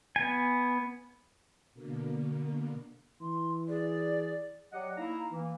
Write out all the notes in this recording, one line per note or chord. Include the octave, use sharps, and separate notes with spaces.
B3 G#5
B2 D3 A#3
E3 C6
G#4 D5
F#3 G4 D5 D#5 F#5
A#3 D#4 E4 F5 A#5
E3 A#3